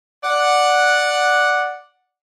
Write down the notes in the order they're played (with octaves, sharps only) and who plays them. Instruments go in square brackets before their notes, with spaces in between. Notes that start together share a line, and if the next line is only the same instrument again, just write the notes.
[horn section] D5 F#5